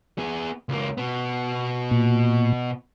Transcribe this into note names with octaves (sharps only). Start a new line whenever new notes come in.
B3 G#4
C#2 A#3
B2 B3
A#2